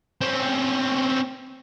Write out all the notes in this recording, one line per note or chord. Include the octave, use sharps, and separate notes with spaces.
C4 C#4